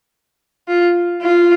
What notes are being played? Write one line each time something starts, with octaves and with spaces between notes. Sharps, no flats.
F4
F4